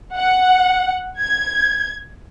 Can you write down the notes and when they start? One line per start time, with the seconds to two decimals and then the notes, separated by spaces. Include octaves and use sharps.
0.16 F#5
1.20 G#6